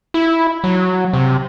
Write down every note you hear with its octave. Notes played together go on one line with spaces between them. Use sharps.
E4
F#3
C3